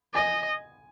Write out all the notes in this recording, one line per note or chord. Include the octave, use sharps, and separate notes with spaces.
D#5 G#5